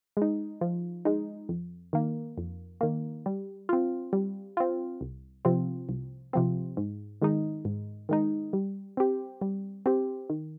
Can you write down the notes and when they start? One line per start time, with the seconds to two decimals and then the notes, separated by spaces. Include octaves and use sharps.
0.17 G#3 D#4
0.61 F3
1.05 G#3 D#4
1.49 F2
1.93 D#3 A#3
2.38 F2
2.81 D#3 A#3
3.26 G3
3.69 C4 F4
4.13 G3
4.57 C4 F4
5.01 C2
5.45 C3 F3 C4
5.89 C2
6.33 C3 F3 C4
6.77 G#2
7.22 D#3 G#3 D#4
7.65 G#2
8.09 D#3 G#3 D#4
8.53 G3
8.97 C4 G4
9.42 G3
9.86 C4 G4
10.30 D#3